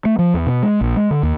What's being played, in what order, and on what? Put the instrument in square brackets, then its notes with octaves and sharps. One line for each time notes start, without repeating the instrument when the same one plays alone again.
[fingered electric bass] A3
F3
E2
B2
G#3
A#1
G#3
D3
D#2